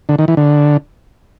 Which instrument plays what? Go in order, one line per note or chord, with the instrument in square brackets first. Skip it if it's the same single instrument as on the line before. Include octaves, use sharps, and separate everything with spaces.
[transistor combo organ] D3
D#3
E3
D3